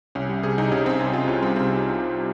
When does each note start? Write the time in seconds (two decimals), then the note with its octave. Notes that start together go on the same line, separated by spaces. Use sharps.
0.15 C2 C#4
0.29 G3
0.43 C3 G#4
0.58 C2 D#4
0.71 C2 C#4
0.86 G3 C4
0.99 C3 C#4
1.13 C2 F4
1.28 C2 C#4
1.42 G3 C4
1.56 C3 C4